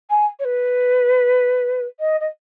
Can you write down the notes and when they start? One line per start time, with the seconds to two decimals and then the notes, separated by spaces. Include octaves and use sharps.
0.10 G#5
0.39 C#5
0.45 B4
2.00 D#5
2.21 D#5